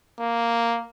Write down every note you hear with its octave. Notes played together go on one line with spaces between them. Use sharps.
A#3